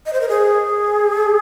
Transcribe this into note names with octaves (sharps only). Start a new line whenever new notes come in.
D#5
C5
A#4
G#4